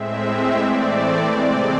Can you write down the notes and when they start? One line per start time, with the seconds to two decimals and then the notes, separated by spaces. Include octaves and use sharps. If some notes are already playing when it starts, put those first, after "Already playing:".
Already playing: A2 G#3 C4 E5
0.23 E5
0.57 E3 A3 C4 D5
1.26 C3 G#3 C4 D5